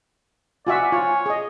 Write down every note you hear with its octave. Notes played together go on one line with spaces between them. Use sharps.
F4 F#4 D5 E5 G#5
F4 C#5
G#4 D#5